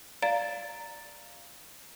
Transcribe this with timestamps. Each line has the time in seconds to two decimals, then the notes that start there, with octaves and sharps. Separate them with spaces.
0.22 D5 F5 A#5 A6 D7